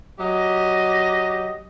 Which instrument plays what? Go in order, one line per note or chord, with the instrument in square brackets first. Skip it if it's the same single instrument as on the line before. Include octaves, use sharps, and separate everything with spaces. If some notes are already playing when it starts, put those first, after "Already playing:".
[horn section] F#3 G4 D#5